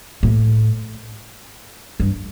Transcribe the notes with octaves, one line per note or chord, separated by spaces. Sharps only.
A2
G2